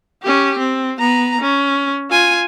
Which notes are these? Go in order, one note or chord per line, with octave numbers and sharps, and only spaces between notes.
C#4 G4
C4
B3 A#5
C#4
F4 G#5